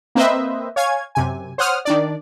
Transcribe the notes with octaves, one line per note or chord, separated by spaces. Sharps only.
A#3 C4 B4 C5 D#5 E5
C#5 F5 G#5 G#6
F#2 C3 G#5
C5 C#5 F#5 D#6 F6
D#3 D4 D5